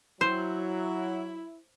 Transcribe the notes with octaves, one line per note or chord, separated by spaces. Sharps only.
F#3 E4 C5